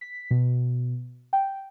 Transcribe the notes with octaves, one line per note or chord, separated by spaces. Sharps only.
B6
B2
G5